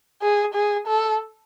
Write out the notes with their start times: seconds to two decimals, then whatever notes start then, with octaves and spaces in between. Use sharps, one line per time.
0.23 G#4
0.55 G#4
0.87 A4